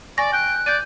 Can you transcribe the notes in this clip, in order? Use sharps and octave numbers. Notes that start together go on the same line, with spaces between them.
D5 G#5 C#6 A#6
G5 F#6
D5 G6 D#7